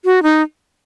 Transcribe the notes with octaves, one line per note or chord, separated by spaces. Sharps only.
F#4
D#4